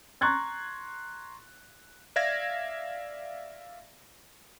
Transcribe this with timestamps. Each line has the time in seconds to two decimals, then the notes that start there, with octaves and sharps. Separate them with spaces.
0.21 A#5 C6 C#6 F#6 G#6 A6
2.16 D5 E5 F5 G#6 A#6